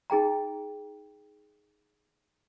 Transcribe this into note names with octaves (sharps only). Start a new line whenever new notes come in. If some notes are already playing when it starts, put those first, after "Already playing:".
D#4 G#4 G5 A#5